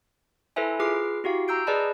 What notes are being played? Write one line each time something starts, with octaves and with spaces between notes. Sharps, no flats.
E4 A4 B4 C5 E5 G#5
F4 G#4 B4 D6 F6 C7
E4 F#4 G4 F5
A#5 E6 G6 D7
G#4 B4 D5 D#5 A5 B5